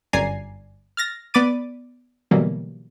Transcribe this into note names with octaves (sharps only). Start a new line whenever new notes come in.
G1 F#2 D5 G#5 A#5 C7
F6 A6 A#6
B3 D5 B5 D6 A6 D#7
B2 D3 E3 F#3 G3 A#3